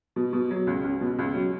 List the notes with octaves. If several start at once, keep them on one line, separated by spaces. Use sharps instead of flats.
B2
B2
F#3
C#2
C#2
B2
C#2
F#3